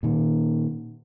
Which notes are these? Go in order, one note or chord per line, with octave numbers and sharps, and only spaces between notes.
A#2 D#3